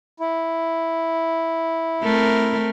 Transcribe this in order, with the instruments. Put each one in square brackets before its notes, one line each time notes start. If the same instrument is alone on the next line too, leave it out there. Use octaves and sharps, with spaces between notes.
[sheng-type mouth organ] E4
[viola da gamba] A3 C4 A#4